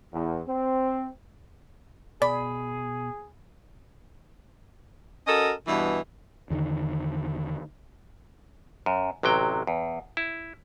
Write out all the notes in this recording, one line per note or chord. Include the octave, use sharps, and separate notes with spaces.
E2
C4
B2 G#4 D5 B5
C#4 F#4 A4 A#4 D#5
G2 B2 E3
E2 D3 D#3
F#2
A1 C3 F#3 G5
E2
E4